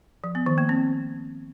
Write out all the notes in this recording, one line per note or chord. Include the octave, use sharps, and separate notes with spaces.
F3
B3
D#3
A#3
C4